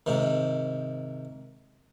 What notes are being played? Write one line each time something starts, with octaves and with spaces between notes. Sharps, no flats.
G#2 C3 D#3